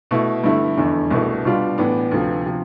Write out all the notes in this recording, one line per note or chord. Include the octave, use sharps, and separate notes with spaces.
B2 A3 E4
G2 D3 A3 E4
F1 E2 D3
C2 B2 A3 E4
B2 G3 D4 F4
A2 E3 B3 D4
D2 C3 F3
C3 F3